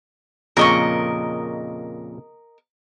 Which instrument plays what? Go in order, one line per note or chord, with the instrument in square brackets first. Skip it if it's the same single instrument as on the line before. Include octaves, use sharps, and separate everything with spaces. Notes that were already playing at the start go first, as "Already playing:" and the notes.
[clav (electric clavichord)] F2 A#2 C#3 [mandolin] A#4 D#5 C#6